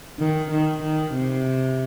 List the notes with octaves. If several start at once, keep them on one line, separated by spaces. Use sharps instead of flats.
D#3
D#3
D#3
C3